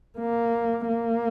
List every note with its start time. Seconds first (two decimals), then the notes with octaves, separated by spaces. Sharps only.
0.18 A#3
0.88 A#3